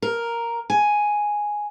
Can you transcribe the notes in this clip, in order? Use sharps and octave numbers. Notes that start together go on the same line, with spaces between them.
A#4
G#5